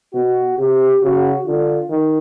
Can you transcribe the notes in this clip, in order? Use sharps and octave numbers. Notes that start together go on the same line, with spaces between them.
B2 F#4
C3 G4
C#3 F#4
D3 F4
D#3